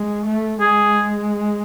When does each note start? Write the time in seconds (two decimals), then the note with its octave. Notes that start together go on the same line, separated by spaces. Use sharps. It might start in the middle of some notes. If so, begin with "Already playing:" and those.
Already playing: G#3
0.26 A3
0.60 G#3 G#4